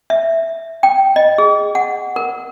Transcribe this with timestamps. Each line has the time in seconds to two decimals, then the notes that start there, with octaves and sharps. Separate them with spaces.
0.10 E5
0.83 G5
1.16 D#5
1.38 G#4
1.75 F#5
2.16 A#4